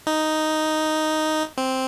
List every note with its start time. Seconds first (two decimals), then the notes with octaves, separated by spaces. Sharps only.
0.07 D#4
1.57 C4